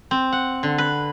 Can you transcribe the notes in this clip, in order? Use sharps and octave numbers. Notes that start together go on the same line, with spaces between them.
C4
F#5
D3
B4